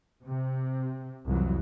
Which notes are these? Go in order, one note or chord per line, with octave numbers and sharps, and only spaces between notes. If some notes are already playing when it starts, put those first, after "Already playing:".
C3
C2 F2 E3 F#3